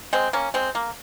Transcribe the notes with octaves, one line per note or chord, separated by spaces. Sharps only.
G#3 C4
A#3 C#4
G#3 C4
A#3